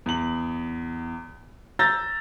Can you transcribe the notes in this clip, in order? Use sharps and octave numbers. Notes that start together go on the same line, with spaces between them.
E2 F#7
A#5 E6 G6 A6 A#6